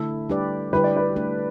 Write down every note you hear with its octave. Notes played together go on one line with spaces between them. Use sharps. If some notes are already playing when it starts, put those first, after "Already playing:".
Already playing: D3 A3 E4 A4 E5
G3 D4 G4 B4 D5
D3 G3 E4 G4 B4
D5
B4
A3 D4 B4